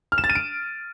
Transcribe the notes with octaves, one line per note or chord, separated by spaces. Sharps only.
F6
E7
A6
D#7
D7